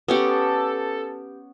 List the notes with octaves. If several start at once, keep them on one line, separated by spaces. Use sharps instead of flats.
B3 C#4 G4 A4